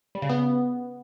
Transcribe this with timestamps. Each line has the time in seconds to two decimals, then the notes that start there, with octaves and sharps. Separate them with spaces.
0.15 G3
0.22 C#3
0.29 B3